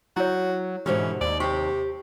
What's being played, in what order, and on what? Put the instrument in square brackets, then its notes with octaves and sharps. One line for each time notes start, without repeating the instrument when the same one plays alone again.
[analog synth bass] F#3 [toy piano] E4 C#5 [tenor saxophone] F#4
[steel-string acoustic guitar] G#2 B2 D3 [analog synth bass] E3 [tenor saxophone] C#4 [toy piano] G4 C5
[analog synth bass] D#2 [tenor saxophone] D5
[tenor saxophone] C3 [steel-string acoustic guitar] G4 [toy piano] C#6